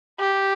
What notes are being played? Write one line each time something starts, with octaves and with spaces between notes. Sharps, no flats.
G4